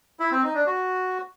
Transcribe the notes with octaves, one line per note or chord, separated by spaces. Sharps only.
E4
C4
D#4
D4
F#4